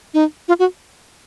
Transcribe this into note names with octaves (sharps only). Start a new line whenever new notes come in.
D#4
F4
F#4